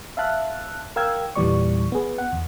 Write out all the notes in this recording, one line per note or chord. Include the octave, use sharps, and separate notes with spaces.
E5 F5 A5 F#6
A#4 F5 G5 E6 G#6
E2 A#2 E3 G3 D5 C#6
B3 G#4
F#5
E2